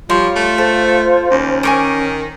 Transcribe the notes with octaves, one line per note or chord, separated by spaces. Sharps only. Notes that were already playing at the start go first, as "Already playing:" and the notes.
F3 G3 F4 C#5 C6
A3
A4 C5
D#2 C#4
D#3 G#5 C#6 D6